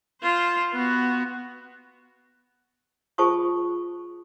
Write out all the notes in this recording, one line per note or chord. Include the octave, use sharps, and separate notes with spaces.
F4 C5
B3 F#4
F4 G#4 C5 A5 C#6 D#6